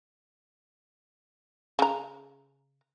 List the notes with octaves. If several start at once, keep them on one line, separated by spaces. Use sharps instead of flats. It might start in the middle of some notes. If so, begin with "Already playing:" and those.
C#3 A#5